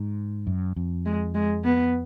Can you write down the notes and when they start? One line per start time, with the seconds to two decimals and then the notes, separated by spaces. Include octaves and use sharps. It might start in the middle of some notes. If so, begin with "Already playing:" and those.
Already playing: G#2
0.47 F#2
0.76 F2
1.06 G#3
1.35 G#3
1.64 B3